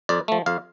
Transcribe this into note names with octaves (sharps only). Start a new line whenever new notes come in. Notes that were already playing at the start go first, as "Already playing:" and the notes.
F2 D5
F3 A3
F2 F5